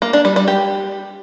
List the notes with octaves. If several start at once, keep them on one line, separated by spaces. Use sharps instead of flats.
A#3
D4
G3
G3
G4